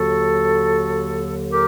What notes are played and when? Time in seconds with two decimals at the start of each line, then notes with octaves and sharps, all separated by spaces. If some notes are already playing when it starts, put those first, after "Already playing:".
Already playing: D#2 D3 F#3 F#4 A4
1.52 G4 A#4